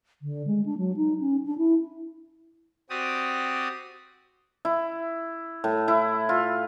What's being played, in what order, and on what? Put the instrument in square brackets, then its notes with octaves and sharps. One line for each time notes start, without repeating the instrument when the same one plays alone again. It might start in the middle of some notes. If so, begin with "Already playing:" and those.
[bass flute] D3
G#3
D4
F#3
D#4
C#4
D4
E4
[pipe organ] C4 F#4 G4 D5 D#6
[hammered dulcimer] E4
A2
E4
F4